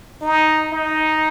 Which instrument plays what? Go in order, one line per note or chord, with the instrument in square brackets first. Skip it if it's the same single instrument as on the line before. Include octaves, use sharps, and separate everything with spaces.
[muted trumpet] D#4
D#4